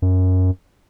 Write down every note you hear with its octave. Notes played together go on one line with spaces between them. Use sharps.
F#2